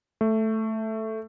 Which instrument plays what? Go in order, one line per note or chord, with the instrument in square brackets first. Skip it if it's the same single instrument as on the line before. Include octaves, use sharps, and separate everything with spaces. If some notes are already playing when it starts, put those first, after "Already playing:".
[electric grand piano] A3